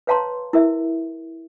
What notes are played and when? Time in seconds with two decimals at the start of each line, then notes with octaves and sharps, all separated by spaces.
0.07 B4 C#5 F5 A5 A#5 C6
0.53 E4 A#4 E5